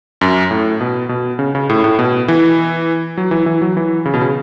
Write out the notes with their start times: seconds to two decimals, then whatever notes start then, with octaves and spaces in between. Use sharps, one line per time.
0.21 F#2
0.51 A2
0.81 B2
1.09 B2
1.39 C#3
1.55 C#3
1.69 A2
1.84 A2
1.99 B2
2.28 E3
3.17 F#3
3.31 E3
3.46 E3
3.62 F#3
3.77 E3
4.05 C#3
4.14 B2
4.21 C#3